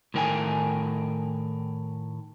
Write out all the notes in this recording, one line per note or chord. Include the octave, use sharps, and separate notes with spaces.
A2 D#3 A#4 C5 G5 G#5